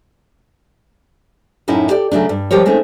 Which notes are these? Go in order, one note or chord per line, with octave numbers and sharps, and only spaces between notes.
F#2 A2 C#4 D#4 E4
G4 A4 D5
C#3 F#3 A3 D4
G2
F3 G3 G4 A#4 C#5
G#3 A3 C4 C#4 D#4